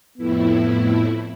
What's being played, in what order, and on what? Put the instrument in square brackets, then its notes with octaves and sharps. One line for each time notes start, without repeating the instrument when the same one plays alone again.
[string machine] F2 A2 E4 [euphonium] B3